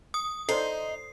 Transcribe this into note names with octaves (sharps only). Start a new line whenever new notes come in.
D#6
D#4 A4 C5 D5 C7